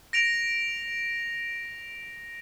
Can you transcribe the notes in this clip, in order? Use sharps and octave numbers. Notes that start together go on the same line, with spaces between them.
A#6 D7 F7